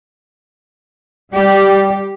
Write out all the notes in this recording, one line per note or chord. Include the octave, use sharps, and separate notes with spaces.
G3 G4 D5